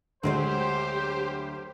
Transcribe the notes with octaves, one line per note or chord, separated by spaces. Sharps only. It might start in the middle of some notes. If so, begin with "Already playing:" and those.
D2 F#3 G#3 C4 G4 C5